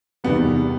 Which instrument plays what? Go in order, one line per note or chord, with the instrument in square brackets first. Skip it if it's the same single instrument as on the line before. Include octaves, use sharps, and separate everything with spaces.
[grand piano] E2 C3 D#3 G3 [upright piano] B3